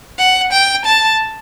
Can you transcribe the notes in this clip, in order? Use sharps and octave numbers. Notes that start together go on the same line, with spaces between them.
F#5
G5
A5